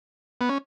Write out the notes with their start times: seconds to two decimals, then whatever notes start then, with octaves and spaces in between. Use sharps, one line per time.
0.41 B3
0.49 C#4